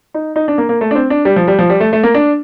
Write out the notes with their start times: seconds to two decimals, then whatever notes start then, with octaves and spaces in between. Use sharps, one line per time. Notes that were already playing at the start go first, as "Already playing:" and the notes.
0.14 D#4
0.36 D#4
0.48 D4
0.58 A#3
0.69 A#3
0.81 A3
0.91 D4
0.95 C4
1.10 D4
1.25 G3
1.36 F3
1.48 G3
1.59 F3
1.70 G3
1.80 A3
1.93 A3
2.03 A#3
2.14 D4